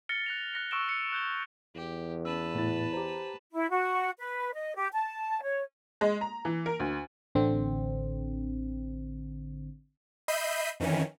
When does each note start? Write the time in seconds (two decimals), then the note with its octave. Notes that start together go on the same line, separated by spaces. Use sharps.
0.09 F6 A6 A#6 C#7 G7
0.26 F#6 A#6 F7
0.54 F#6 A#6 C#7
0.71 C#6 E6 F6 D7 E7 G7
0.89 C#7
1.12 F#6 G6 G7
1.75 E2 G4
2.25 C#4 B4 A5 E6
2.55 A2 B3 E4 A6
2.93 G4 C5 A#5
3.53 E4
3.70 F#4
4.19 B4
4.54 D#5
4.76 G4
4.93 A5
5.41 C#5
6.01 G#3
6.21 A#5
6.45 E3
6.66 A#4
6.80 D2
7.35 A1 D3 C4
10.28 D#5 E5 B5 G6 C7 D#7
10.80 F2 D#3 E3 C#4